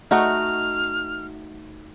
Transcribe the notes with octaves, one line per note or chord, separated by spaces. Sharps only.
A3 D#4 F#4 F6